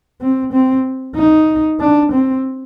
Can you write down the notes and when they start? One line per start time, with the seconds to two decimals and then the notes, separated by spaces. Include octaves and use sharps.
0.21 C4
0.53 C4
1.16 D#4
1.80 D4
2.12 C4